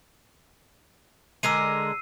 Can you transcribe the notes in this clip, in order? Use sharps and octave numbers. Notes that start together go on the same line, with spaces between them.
D3 G#3 A#4 E6 C7 D#7